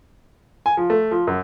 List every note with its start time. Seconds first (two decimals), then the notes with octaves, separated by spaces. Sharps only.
0.66 G#5
0.77 F3
0.90 A3
1.11 F3
1.27 F#2